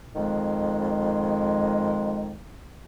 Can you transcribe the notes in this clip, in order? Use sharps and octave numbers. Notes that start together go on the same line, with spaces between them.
F2 D#3 G#3